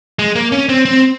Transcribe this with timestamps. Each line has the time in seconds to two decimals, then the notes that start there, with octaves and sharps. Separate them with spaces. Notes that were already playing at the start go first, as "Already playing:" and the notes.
0.19 G#3
0.35 A#3
0.52 C#4
0.69 C4
0.85 C4